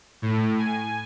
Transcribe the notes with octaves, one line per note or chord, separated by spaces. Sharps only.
A2
G#5